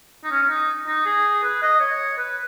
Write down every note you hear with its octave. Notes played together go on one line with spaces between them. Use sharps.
D#4
C#4
C#4
D#4
D#4
G#4
B4
D#5
C#5
B4